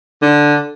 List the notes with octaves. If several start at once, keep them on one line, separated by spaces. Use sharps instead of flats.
D3